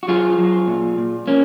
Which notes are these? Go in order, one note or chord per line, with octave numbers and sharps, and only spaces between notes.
F#4
F#3 F4 G#4
F#3
A#2
A#2
A#2 A#3 C#4